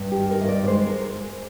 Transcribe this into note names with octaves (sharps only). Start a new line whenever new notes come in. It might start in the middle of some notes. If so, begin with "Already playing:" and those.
Already playing: G2
G4
D#3
A#4
G2 D#5
D5
D5
G#3 C5
A#4